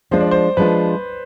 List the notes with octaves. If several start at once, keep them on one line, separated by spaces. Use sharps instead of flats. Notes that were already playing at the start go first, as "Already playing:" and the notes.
F3 G#3 D4 F4 C5
D5
C5
F3 G#3 D4 F4 B4